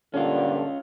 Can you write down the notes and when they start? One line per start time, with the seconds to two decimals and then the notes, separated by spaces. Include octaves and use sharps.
0.14 G2 A#2 D3 C#4 F4